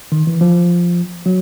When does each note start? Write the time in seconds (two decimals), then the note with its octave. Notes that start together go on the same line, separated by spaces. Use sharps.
0.12 D#3
0.27 E3
0.41 F3
1.26 F#3